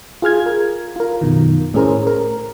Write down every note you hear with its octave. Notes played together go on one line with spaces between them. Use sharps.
F4 G#4 F6 G#6
A#4
F4 A#4
F#2 B2 D#3
A2 C#4 G#4 A#4 C5
A#4